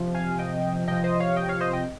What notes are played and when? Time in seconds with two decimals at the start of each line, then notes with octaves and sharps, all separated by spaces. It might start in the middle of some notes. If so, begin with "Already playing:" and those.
Already playing: C3 F3
0.15 F5 G#5
0.39 D#5 G5
0.88 C3 F3 D#5 G5
1.04 C5 D#5
1.20 C#5 F5
1.36 D#5 G5
1.48 C#5 F5
1.60 C5 D#5
1.73 D#5 G5